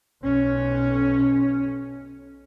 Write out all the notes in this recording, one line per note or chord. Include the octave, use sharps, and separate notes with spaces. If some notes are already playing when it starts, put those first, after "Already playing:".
B1 C#4